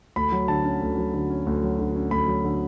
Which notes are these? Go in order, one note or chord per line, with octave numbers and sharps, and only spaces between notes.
D2 B5
F#3
D3 A5
C#4
D2
F#3
D3
C#4
D2
F#3
D3
C#4
D2 B5
F#3
D3